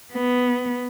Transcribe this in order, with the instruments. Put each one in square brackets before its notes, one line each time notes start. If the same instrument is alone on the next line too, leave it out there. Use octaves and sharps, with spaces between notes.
[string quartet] B3